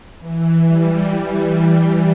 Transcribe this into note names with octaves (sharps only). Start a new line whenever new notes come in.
E3
G3
G3
G3